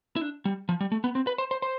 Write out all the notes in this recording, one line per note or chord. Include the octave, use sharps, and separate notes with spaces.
E4
D4
G3
F3
G3
A3
B3
C4
B4
C5
C5
C5